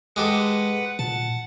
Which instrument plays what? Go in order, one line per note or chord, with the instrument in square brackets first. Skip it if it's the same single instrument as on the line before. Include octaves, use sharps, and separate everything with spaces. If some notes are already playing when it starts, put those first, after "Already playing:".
[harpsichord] G#3 G4 A4 [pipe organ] B4 F#5
[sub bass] A#2 [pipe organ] F#5 [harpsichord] A5